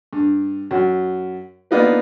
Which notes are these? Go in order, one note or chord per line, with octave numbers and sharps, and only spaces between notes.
G2
F#2
A#3 B3 D4 D#4 F4 B4